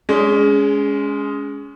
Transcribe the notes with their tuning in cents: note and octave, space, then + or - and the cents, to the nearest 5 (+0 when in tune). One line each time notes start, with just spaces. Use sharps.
G#3 +0 C#4 +25